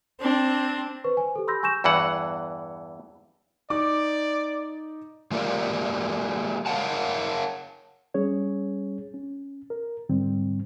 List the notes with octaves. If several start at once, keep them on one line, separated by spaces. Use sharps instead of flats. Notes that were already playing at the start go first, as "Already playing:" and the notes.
C4 D4
B4 C5 C#6
C5 G#5
G4 A4
B5 C6 E6 G6 A#6
G#5 C#6 G6 A#6 E7
E2 G2 E3 F#5
D#4 D5 D6
G#3 A#3 F4 G4 A#4 D5
A#4 C#5 D#5 F5 F#5 A5
G3 C#4 G#4 C#5
C#4
A#4
G#2 D3 G3 C4